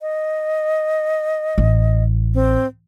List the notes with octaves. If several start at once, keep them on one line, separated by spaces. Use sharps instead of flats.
D#5
A1
C4